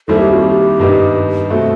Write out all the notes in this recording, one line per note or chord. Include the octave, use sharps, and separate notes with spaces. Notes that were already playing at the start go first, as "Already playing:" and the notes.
D#2 D#3 G3 C4 E4 A4
G4
F#4
G4
G2 D#3 G3 B3 D#4
B2 A3 C4 F#4 A4